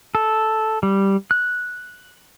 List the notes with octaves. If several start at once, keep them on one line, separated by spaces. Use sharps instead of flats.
A4
G3
F#6